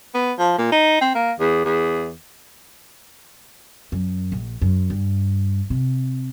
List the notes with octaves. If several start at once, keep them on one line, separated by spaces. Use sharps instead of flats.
B3
F3
A#2
D#4
C4
A#3
E2
E2
F#2
A#1
F#2
G2
C3